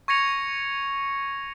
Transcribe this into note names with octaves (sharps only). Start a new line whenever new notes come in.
C#6 G#6 A#6 C#7 F7